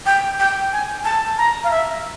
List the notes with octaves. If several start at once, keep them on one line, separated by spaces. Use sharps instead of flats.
G5
G5
G#5
A5
A#5
F5
E5